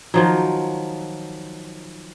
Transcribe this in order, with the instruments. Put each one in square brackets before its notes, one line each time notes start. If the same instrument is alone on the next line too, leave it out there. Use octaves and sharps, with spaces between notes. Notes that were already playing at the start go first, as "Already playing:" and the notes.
[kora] D#3 F3 F#3